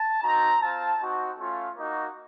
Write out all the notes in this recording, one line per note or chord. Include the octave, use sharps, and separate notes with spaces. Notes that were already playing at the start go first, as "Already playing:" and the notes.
Already playing: A5
C4 D#4 F#4 A#5
C4 F4 A5
C4 D#4 F#4
A3 C#4 F4
A#3 D#4 F#4